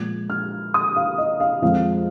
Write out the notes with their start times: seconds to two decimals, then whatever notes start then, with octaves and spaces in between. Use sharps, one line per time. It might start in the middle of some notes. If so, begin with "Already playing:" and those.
Already playing: A#2 F3 G#3 G#6
0.30 F6
0.74 D#6
0.96 F5
1.18 D#5
1.40 F5
1.62 F2 F3 G#3 F5